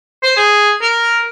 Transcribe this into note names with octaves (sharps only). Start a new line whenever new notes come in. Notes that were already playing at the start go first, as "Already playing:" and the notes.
C5
G#4
A#4